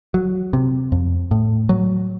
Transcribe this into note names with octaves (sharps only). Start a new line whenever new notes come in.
F#3
C3
F2
A2
F#3